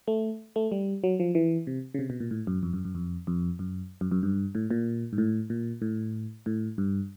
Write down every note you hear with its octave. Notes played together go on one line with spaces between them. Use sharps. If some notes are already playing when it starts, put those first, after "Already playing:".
A3
A3
G3
F#3
F3
E3
C3
C#3
C3
B2
A#2
A2
F#2
F2
F#2
F#2
F2
F2
F#2
F#2
F#2
G2
A2
A#2
G#2
A2
A#2
A2
A2
G2